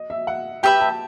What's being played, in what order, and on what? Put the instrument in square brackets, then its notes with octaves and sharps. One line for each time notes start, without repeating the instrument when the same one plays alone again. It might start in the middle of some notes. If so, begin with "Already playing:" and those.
Already playing: [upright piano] D#5
E5
F#5
[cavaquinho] G4 B4 E5 B5 [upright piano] G5
[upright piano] A5